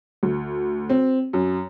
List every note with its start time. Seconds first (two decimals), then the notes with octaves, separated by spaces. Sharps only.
0.23 D2
0.90 C4
1.33 F#2